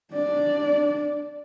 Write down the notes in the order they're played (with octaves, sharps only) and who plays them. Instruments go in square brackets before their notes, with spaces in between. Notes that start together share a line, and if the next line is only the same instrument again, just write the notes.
[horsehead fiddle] D4 D5